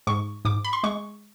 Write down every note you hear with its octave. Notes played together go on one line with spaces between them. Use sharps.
G#2 C#6
G#2 D6
B5
C6
G#3 C#6